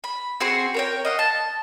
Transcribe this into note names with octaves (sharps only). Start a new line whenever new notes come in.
B5
C4 F#4 G#4 C6
A#4 C#5 G5
D#5 F5 F#5
A5